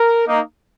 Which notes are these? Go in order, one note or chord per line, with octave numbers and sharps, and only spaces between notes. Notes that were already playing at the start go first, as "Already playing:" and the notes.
Already playing: A#4
A#3 D#4